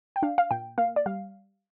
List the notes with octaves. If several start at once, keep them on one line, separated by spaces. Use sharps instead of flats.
G5
D4 F5
F5
A#2 G5
A#3 F5
D5
G3 F5